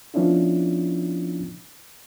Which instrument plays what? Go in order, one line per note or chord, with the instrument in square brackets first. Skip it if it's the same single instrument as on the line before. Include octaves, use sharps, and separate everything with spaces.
[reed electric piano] F3 B3 C#4 D4 E4 F4